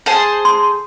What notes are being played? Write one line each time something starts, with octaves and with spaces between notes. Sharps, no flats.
G#4 C5 A5
C6